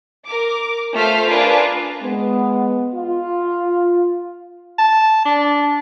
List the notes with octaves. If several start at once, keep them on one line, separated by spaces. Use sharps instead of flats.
A#4 D6
A3 F4 A4 C5 F6 B6
D4 F4 G#4 A#4 B4
G#3 B3
F4
A5
D4